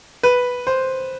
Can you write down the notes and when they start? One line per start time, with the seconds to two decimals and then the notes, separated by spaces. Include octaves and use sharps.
0.23 B4
0.67 C5